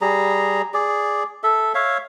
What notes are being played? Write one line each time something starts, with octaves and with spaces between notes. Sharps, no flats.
G3 G#4 A#5
G#4 D5
A4 E5
C#5 E5 F5